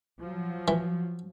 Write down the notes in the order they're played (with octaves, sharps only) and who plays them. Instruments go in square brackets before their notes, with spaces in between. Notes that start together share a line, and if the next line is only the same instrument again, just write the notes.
[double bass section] F3 F#3
[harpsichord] E3